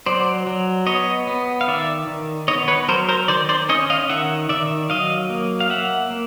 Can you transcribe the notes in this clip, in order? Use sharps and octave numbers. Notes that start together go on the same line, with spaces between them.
F#3 C5 D5
F#3
B3 C#5 D#5
B3
F5
D#3 D5 E5
D#3
B3 C#5 D#5
B4 C#5
F#3 A#4 C5
A#4 C5
D#3 C5 D5
C5 D5
C#4 C#5 D#5
D#5 F5
D#3 E5 F#5
D#3 D5 E5
F#3 D#5 F5
A#3
F5
A#3 E5 F#5
A#3